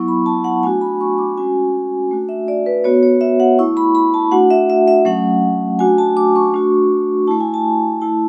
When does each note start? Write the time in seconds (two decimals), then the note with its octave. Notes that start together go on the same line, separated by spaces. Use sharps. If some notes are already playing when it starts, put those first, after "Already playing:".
Already playing: F#3 B3 E4 C#6
0.08 B5
0.26 A5
0.44 F#5
0.63 A3 D4 F#4 G#5
0.81 B5
1.01 C#6
1.18 D6
1.37 G#3 C#4 F#4 G#5
2.11 A3 D4 F#4
2.29 E5
2.48 D5
2.66 B4
2.84 B3 F#4 C#5
3.03 C#5
3.21 E5
3.40 F#5
3.59 A3 E4 C#6
3.77 B5
3.95 B5
4.14 A5
4.32 A3 D4 F#4 F#5
4.50 E5
4.70 E5
4.88 E5
5.05 F#3 A3 C#4 F#5
5.79 A3 D4 F#4 G#5
5.98 A5
6.17 D6
6.36 C#6
6.54 A3 D4 F#4
7.27 A3 E4 A5
7.40 G#5
7.54 A5
8.01 A3 E4 A5